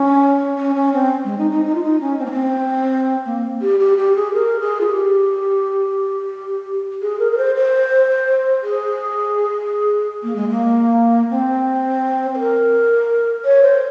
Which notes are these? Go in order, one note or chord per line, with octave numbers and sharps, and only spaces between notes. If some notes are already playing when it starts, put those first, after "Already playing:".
Already playing: C#4
C#4
C#4
C4
G#3
D#4
D#4
D#4
F4
D#4
C#4
C4
A#3
C4
A#3
G4
G4
G4
G#4
A#4
G#4
F4
G4
G#4
A#4
A#4
C5
C5
G#4
A#3
G#3
A#3
C4
C5
A#4
C#5
C5